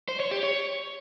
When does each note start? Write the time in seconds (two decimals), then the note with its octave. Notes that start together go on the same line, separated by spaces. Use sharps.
0.08 C5
0.20 C#5
0.31 G4
0.43 C#5